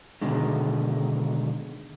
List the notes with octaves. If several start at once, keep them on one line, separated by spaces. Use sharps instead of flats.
B2 D3 D#3 G#3